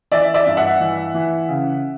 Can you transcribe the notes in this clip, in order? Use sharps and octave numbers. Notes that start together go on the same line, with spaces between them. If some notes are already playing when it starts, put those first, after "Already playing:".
E3 D5 E5
D5 E5
G2
E5 F#5
E3
E3
C#3